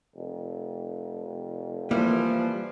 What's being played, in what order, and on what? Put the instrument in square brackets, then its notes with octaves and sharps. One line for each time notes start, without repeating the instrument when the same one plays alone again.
[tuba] F1
[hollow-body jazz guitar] E3 G3 [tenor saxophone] F3 [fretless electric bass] A#3